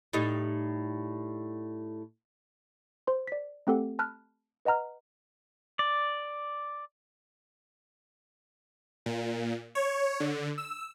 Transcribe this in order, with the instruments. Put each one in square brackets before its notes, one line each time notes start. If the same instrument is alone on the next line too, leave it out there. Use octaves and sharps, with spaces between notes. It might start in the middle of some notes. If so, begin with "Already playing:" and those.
[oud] A2 G3 D#4
[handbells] C5 C6
D5 B6
A3 C4 G4 A4 F#5
A5 B5 F6 F#6
B4 D#5 F#5 A#5 F6
[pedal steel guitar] D5
[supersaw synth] A#2
C#5
D3
E6